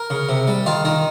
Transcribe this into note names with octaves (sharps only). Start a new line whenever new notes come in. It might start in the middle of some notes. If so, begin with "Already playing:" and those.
Already playing: A#4
C#3
C3
G3
D#3 F4
D#3 D#4